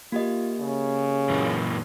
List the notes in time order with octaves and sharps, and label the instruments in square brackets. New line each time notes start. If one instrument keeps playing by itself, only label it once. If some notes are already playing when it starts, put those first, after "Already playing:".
[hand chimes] A#3 G4 D#5 [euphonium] F4
[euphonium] C#3
[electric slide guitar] F#2 A#2 E3